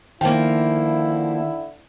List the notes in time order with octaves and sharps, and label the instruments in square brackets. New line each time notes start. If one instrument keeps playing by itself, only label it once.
[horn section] D3 E4 [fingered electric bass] D#3 [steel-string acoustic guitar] F3 A#3 [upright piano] G5